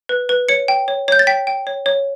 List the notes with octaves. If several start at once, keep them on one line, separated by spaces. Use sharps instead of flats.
B4
B4
C#5 C#7
G5
C#5
C#5 G6
A6
G5 B6
G5
C#5
C#5